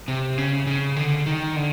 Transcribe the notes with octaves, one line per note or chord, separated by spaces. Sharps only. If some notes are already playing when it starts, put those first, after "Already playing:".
C3
C#3
C#3
D3
D#3
D3